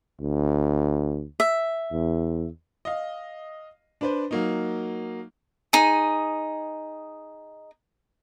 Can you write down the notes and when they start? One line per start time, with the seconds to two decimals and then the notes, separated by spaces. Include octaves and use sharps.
0.21 D2
1.40 E5
1.92 E2
2.85 D#5 F5
4.01 D4 B4 C5
4.31 F#3 A#3 D#4
5.73 D#4 G#4